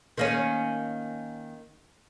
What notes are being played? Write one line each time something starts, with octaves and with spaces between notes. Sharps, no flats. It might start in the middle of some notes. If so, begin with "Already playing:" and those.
D#3 A#3 C#4